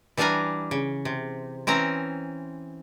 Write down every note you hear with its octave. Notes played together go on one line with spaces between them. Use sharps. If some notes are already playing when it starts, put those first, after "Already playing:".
E3 G3 D4 F5 G#5 A#5
C#3
C3
E3 C4 C#4 A#5